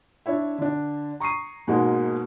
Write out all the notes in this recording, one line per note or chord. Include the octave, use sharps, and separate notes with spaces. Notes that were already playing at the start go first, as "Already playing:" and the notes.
D4 E4 C#5 E5
D3 D4
A#5 C#6 D#6 C7 D#7
G#2 B2 G#3 A#3